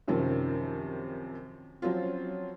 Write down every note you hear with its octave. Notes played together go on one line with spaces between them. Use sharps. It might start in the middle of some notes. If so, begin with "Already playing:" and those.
F#2 C3 D#3 F3
F3 F#3 C4 C#4 F4